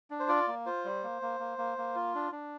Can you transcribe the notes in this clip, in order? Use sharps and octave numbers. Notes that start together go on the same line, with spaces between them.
D4
C5
F4 D5
A#3
F4 C5
G3
A#3
A#3
A#3
A#3
A#3
F4
D4
D4